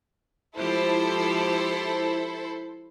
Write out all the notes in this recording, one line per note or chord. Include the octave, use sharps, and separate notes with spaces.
F3 G#3 E4 G4 A4 C5